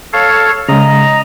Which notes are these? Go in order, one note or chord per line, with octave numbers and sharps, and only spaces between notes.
A4 C#5 F5
C#3 G#3 D#5 A#5